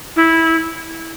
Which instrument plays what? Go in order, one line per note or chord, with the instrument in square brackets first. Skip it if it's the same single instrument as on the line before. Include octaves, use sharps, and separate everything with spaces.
[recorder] E4